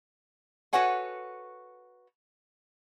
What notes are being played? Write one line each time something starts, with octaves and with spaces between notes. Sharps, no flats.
F#4 A4 B4 C#5 F#5 G#5